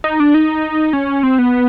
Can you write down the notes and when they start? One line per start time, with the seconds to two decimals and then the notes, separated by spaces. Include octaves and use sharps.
0.04 D#4
0.20 D4
0.34 D#4
0.93 C#4
1.23 C4
1.39 B3